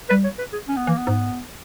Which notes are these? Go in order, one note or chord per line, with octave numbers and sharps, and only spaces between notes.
G3 B4
C#5
B4
G#4
C#4
B3
E3 A#3
B3
G#2